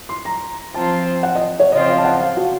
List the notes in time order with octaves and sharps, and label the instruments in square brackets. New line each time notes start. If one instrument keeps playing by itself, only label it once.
[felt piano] C6
A#5
[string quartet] F3 C4 F4 [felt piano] A5
[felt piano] F#5
D#5
C#5
[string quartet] C#3 F3 C4 F4 [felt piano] D#5
[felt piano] F5
A5
F#5
F5
F#4